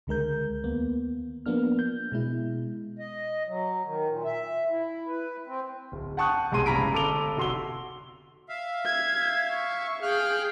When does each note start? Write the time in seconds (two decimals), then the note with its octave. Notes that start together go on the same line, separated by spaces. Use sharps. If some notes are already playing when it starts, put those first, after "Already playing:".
0.07 C#2 D3 G#3 A#4 G6
0.64 D#2 A#3 B3
1.46 F3 A#3 B3 D4 F6
1.79 G6
2.12 B2 G#3 E4
2.99 D#5
3.47 F#3
3.85 D#3
4.09 A#2
4.24 E5
4.70 E4
5.08 B4
5.47 C4
5.92 D1
6.17 F#5 G5 A5 C#6 D#6 F#6
6.52 E1 C2 G#3 G#5 C6 D#7
6.66 F#1 G2 A#5 B5 B6 D7
6.93 G1 A4 D6 D7 F7 G7
7.37 F1 F#4 C6 E6 G7
8.49 E5 F5
8.85 G#6
9.52 C#6
10.02 G#4 F5 G5 F6 F#6